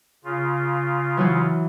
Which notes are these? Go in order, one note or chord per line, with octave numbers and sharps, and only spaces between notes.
C#3 F4
E3 F#3 E4